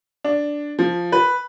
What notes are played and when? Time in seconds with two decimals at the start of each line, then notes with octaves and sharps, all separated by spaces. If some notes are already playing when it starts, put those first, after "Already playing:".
0.24 D4
0.79 F3
1.12 B4